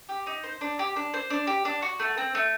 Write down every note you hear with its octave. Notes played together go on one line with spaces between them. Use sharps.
G4
D#4
C5
D4
G4
D4
C5
D4
G4
D4
F#4
A3
C4
A3